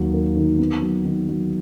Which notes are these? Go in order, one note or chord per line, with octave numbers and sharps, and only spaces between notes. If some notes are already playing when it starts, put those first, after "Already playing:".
Already playing: D#2 F#3
A#3
D#3
B3
F#3
D#3
F#3